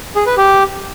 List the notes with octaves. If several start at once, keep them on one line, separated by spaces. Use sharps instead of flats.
G#4
B4
G4